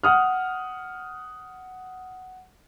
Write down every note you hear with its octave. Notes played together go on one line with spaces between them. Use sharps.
F#5 D#6 F6